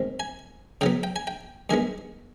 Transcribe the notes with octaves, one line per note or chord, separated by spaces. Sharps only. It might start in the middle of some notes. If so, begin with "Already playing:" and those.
Already playing: G#2 D#3 G#3 C4
G#5
C#3 F#3 B3 G5
G5
G#5
G5
G2 D#3 G#3 B3 G#5